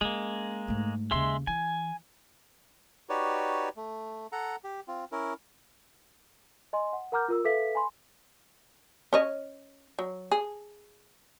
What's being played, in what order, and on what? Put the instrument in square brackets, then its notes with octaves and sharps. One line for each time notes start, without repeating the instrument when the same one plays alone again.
[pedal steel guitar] G#3 A#3 [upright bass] C#4
[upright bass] G#2 A3
[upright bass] D#2 C#3 [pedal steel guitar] G#3 E5 C6
[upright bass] E3 [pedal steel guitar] G#5
[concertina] D#4 F#4 G4 B4 C#5 D5
A3
A4 F#5 A#5
G4
C4 F4
C#4 E4 A#4
[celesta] D#5 G#5 C6
F#5
A#4 F#5 A#5 D6 F6 G6
F4 A#4 E6
A4 B4 E5 F5 B6
G#5 B5 C6
[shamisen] C#4 C#5 D#5
F#3
G#4